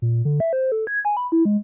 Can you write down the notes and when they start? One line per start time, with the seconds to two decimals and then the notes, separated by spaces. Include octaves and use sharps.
0.02 A#2
0.25 D3
0.40 E5
0.53 C5
0.72 A4
0.87 G#6
1.05 G#5
1.17 B5
1.32 E4
1.45 G#3